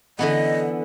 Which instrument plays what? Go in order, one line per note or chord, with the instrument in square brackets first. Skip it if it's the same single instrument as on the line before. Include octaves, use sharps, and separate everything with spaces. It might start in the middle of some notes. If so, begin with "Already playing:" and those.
[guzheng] D3 E3 B3 [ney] D#5